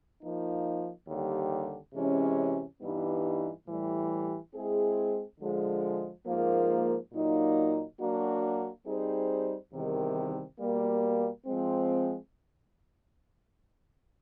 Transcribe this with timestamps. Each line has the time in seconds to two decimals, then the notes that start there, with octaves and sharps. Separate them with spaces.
0.21 F3 A#3 D#4
1.07 D#2 D3 G3
1.94 C3 E3 G#3 C#4
2.81 G2 E3 G3 B3 D#4
3.67 A2 E3 G3
4.54 G#3 C4 E4 G#4
5.40 D3 F3 G#3
6.26 G#2 F3 A#3
7.13 A#2 F#3 A#3 D#4
8.00 F#3 A#3 D4 F#4
8.86 G3 C4 D#4 G#4 C5
9.72 E2 C3 D#3 G3
10.60 B2 G3 A#3
11.46 F3 G#3 C4